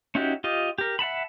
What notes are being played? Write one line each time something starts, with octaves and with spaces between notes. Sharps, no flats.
C#4 D#4 E4 F#4 G4
F4 G4 D#5
G4 A#4
E5 F#5 A5 B5